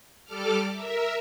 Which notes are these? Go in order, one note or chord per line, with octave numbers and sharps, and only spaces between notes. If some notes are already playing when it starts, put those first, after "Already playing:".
G3 A4 D6 F6
A#4 E5